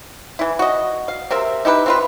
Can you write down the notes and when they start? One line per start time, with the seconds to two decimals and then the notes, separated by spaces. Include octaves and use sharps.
0.39 E3 E4
0.59 F#4 D#5
1.08 F5
1.31 C3 C4 A#4 E5
1.65 D#4 E4 G4 B4
1.86 C4 F4 B4